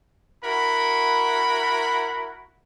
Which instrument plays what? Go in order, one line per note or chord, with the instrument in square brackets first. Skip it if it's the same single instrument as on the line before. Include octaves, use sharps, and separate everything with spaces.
[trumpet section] E4 F#4 A#4 F#5 B5